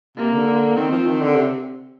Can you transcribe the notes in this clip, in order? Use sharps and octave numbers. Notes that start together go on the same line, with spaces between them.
C3 A#3
D3
D3
D#3 C4
F3
D#3
D3
C3